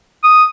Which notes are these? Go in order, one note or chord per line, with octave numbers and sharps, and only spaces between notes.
D#6